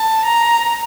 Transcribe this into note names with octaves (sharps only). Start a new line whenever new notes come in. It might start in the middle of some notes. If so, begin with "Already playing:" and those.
Already playing: A5
A#5